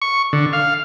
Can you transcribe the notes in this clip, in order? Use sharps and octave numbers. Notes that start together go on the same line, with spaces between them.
C#6
D3
F5